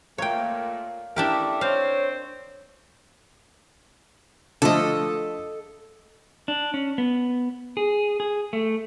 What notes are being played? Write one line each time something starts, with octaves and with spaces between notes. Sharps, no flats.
A#2 A3 A#3 C#5 G5
A3 D4 E4 G4 A#4
C4 C5 C#5 F5
D3 F3 A3 A4 D#5
D4
C#4
B3
G#4
G#4
A3